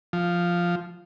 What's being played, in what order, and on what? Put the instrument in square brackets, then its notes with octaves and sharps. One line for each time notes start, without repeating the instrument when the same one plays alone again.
[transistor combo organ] F3